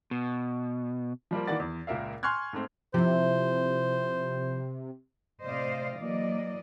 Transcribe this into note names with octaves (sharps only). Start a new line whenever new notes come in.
B2
F3 G3 A#3
D#3 E3 A#3 D5 F#5 A6
E2
C#2 A#2 A#3 A#4 E5 F5
G#5 C6 C#6 F6 F#6 G#6
G#2 A3 C4
C3 F3 E4 C5
A2 C3 C5 D5 D#5 F5
E3 F#3 A#3 D5 D#5